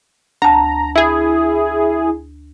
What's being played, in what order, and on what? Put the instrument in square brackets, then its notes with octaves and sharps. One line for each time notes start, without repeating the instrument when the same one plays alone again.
[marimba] D2 A5 [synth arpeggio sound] A#5
[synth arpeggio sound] E4 G#4